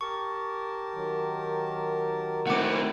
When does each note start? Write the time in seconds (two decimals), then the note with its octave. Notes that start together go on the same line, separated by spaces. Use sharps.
0.01 G4 A#4 A5 C#6
0.94 D#3 F#3
2.47 A3 C4 E4 F#5 D6